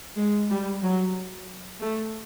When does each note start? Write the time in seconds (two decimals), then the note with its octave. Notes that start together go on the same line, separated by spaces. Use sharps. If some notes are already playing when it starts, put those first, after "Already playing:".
0.16 G#3
0.49 G3
0.82 F#3
1.81 A3